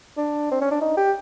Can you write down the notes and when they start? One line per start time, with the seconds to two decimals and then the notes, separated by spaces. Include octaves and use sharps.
0.17 D4
0.51 C4
0.61 C#4
0.71 D4
0.81 D#4
0.97 G4